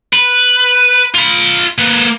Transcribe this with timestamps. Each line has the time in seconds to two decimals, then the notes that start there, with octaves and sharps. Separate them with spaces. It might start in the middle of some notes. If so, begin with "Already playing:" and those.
0.13 B4
1.15 F4 B5
1.78 A#3 B4